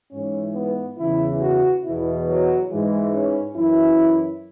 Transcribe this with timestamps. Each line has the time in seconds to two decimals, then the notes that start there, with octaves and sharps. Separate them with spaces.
0.11 G#2 E3 C#4
0.54 B3
0.97 E2 C#3 E3 E4
1.40 F#4
1.84 E2 B2 E4
2.27 F#3
2.70 G#2 E3 G#3
3.13 C#4
3.56 F#2 E3 E4